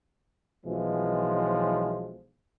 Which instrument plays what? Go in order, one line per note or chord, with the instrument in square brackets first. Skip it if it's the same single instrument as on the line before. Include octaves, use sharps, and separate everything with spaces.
[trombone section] B1 B2 E3 F3 G#3